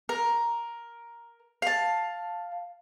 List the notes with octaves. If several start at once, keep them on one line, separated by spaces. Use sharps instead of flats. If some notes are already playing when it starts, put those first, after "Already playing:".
A#4
F5 A5